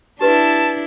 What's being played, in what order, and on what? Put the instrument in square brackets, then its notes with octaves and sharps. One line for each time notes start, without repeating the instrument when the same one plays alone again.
[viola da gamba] D4 E4 [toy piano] G4 B4 C6 [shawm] A5